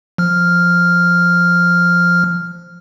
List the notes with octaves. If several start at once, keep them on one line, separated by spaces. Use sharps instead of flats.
F3 F6